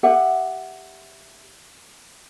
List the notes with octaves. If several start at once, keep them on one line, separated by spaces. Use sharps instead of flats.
G4 E5 F#5